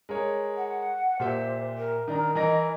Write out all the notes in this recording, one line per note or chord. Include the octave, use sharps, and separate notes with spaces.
G#3 A#4 C#5
F#5
A#2 G4 C5 E5
A#4
D#3 D4 A#5
E3 A#4 D#5 A#6